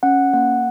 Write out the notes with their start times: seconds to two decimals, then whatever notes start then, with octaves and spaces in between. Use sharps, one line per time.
0.03 C#4 F#5
0.34 A#3 F#5